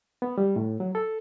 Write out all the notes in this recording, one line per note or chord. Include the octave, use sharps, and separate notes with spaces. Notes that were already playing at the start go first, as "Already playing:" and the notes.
B3
G3
A2
F#3
A4